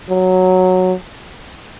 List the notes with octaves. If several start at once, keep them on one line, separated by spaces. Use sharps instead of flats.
F#3